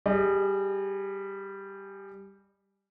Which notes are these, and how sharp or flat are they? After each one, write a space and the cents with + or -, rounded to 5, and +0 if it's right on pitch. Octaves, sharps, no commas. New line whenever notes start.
G3 +0 G#4 +0 D#5 -45